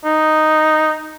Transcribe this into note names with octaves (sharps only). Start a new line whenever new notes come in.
D#4